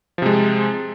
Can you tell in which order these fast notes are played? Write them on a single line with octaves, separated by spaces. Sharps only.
F3 C3 G#3